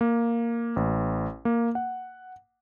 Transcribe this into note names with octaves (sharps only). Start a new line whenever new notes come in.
A#3
A1
A#3
F#5